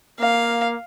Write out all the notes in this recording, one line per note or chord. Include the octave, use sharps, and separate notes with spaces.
A#3 F5